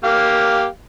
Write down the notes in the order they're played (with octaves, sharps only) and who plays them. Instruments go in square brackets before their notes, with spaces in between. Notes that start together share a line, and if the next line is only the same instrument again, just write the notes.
[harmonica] A#3 G4 F5